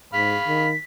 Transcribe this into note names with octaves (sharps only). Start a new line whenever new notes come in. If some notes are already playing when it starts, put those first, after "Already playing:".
G#2 F5 B5 B6
D#3